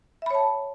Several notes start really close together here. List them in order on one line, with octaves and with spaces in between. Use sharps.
E5 B5 C#5 A5